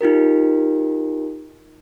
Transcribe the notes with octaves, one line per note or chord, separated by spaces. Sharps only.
D#4 F4 G4 A#4